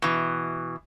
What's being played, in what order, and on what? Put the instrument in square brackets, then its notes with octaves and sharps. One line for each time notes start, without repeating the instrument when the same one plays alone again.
[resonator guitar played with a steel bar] B2 E3